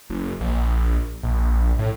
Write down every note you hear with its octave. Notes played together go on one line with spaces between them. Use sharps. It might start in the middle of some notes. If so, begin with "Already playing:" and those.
F#1
A#1
A#1
A2